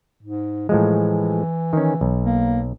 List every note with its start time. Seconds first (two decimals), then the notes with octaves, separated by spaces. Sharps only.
0.23 G#2
0.69 A2 E3 F3 G#3
1.73 D#3 C#4
2.01 B1
2.23 A#3